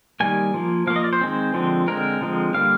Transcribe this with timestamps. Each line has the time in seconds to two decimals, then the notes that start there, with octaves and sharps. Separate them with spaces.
0.20 D#3 G3 A#3 G#5
0.54 F3 A#3
0.87 F3 A#3 F5
0.96 D#5
1.04 D5
1.13 C5
1.21 D#3 G#3 C4
1.54 D3 F3 G#3 C4
1.87 D3 G#3 C4 A#4
2.21 D3 F3 G#3 C4
2.54 D3 G3 A#3 F5